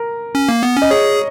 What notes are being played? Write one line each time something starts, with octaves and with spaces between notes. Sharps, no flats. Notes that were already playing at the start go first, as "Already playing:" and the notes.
Already playing: A#4
C#4
A#3
B3
C#4
D#5
G#4 C#5